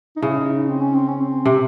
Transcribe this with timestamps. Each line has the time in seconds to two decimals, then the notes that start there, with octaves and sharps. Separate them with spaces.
0.16 D#4
0.22 C#3 E4
0.37 D#4
0.53 D#4
0.69 C4
0.82 C#4
0.95 C4
1.08 C#4
1.21 C4
1.45 C3 C4